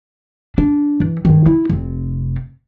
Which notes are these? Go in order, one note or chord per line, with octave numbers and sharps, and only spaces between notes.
D4
E3
G2 D#3
E4
F1 C3